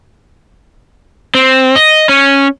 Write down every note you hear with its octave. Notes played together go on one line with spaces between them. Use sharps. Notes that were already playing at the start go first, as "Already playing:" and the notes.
C4
D#5
C#4